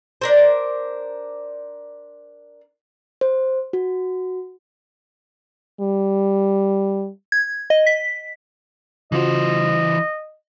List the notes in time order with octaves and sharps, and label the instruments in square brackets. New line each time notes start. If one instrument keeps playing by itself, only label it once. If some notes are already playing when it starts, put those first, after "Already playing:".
[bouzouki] D4 A#4 C5
[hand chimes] C5
F#4
[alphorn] G3
[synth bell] G#6
D#5
B6
[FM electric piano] C#3 F4 F#4 [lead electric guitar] E3 C5 [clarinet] D#5